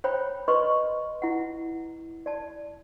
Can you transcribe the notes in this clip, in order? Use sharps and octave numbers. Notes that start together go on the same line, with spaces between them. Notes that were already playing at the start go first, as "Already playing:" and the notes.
C5 C#5 G5 A#5 B5
B4 D#5 C6 C#6
E4 F#5
D5 A5